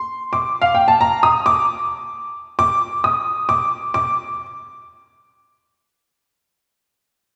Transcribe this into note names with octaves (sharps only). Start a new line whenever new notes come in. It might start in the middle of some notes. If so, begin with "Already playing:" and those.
Already playing: C6
D6
F5
G5
A5
A#5
D#6
D6
D6
D#6
D6
D6